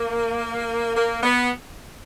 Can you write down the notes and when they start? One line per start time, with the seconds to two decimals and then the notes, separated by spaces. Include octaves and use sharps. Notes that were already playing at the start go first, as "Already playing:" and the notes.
Already playing: A#3
0.96 A#3
1.23 B3